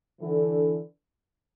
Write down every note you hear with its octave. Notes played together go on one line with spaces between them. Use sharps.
D3 E3